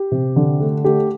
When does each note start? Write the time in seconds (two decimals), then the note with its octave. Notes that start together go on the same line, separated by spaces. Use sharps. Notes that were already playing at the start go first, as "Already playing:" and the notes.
Already playing: G4
0.11 C3
0.36 D3
0.60 A3
0.84 A3 G4